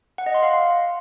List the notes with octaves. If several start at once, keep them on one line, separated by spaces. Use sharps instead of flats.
F#5
D#5
C6
F5